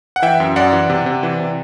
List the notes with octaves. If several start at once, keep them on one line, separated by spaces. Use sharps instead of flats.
F#5
E3 E5 G5
F#2
F#2 D5 F#5
E3
C3
C3
E3
C3